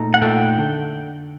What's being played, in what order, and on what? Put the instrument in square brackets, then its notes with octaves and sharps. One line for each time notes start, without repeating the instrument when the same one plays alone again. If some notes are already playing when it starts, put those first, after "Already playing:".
Already playing: [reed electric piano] A#2 A3 D#4 A4 [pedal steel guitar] A#5
[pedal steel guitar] F#5
[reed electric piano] A#2 A3 D#4 A4 [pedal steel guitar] G5
[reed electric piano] D3